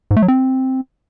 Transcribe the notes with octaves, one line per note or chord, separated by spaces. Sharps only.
G#2
A3
F#3
C4